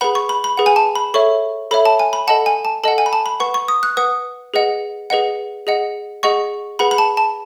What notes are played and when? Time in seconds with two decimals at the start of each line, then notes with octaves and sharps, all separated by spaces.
0.01 G#4 B4 F#5 B5
0.15 C#6
0.29 B5
0.44 B5
0.57 G#4 B4 F#5
0.66 G#5
0.76 A5
0.95 B5
1.14 A4 C#5 E5 C#6
1.71 A4 C#5 E5 B5
1.85 A5
1.99 G#5
2.13 B5
2.27 A4 D#5 F#5 A5
2.46 G#5
2.65 A5
2.84 A4 D#5 F#5 A5
2.98 G#5
3.06 B5
3.13 A5
3.26 B5
3.40 B4 F#5 C#6
3.54 C#6
3.68 D#6
3.83 F#6
3.97 B4 F#5 D#6
4.54 G#4 B4 D#5 F#5
5.10 G#4 B4 D#5 F#5
5.67 G#4 D#5 F#5
6.23 G#4 D#5 F#5 C#6
6.79 G#4 B4 F#5 B5
6.91 B5
6.98 A5
7.17 A5